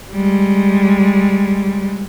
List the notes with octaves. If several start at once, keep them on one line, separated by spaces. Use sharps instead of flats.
G3 G#3